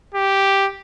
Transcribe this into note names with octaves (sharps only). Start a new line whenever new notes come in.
G4